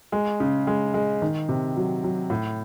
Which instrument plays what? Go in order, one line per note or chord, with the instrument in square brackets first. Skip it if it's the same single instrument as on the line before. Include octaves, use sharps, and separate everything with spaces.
[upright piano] G#3
C#3
G#3
G#3
D#3
C3
F#3
F#3
A2